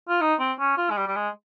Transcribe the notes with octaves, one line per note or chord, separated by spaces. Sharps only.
F4
D#4
C4
C#4
F4
G#3
G3
G3
G#3